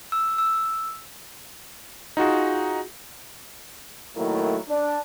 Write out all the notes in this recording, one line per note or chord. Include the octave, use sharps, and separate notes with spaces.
E6
E6
D#4 F4 F#4 G#4
A2 D#3 F#3 A3 A#3 E4
D4